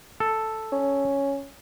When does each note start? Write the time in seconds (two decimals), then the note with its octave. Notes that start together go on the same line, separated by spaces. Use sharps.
0.20 A4
0.72 C#4